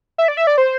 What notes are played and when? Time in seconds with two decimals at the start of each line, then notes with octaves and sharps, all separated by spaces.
0.18 E5
0.28 D5
0.37 E5
0.47 D5
0.58 C5